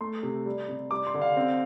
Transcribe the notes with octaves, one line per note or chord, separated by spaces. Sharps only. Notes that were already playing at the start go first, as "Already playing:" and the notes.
A3 C6
C3
G3
C3
G3 D6
C6
D3
F5
C4